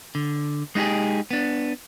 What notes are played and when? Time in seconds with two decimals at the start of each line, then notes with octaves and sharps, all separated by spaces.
0.15 D3
0.75 G#3 D#4 F4 G4 G#4
1.31 B3 D4